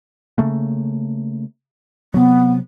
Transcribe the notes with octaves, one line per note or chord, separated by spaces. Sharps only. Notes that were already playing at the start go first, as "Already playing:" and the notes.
C#3 A3 A#3
C3 F#3 B3